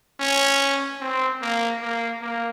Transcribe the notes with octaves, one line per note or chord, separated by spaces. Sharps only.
C#4
C4
A#3
A#3
A#3